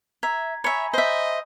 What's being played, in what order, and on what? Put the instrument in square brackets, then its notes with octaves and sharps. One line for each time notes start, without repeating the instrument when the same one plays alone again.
[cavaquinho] E5 [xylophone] A#5 [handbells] G#6
[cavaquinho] C#5 E5 [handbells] G#5 A#5 B5 [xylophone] G#6 C#7
[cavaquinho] C5 E5 [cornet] D#5 [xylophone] G6